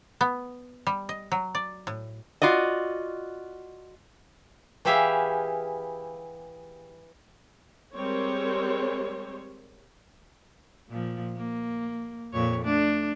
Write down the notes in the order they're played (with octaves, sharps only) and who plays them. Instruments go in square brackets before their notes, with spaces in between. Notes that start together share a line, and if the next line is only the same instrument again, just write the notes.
[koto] B3
G3
D#5
F#3
D5
A2
[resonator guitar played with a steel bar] F4 F#4 D5 D#5
[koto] E3 E4 G4 G#4 E5 F5
[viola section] G3 G#3 C4 A#4 C5 C#5
[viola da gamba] A#2 F3
A#3
F2 A#2 C#5
A3 D4